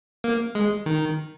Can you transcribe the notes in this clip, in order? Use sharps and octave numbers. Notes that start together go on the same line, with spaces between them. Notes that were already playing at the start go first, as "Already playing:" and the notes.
A#3
G#3
D#3